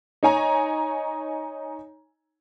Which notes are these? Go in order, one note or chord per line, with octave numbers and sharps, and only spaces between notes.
D#4 C#5 G#5 A#5